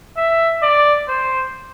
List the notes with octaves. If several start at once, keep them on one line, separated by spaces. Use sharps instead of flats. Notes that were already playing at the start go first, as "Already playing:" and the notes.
E5
D5
C5